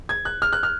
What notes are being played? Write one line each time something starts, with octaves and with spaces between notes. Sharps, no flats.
G#6
F#6
F6
F#6
F6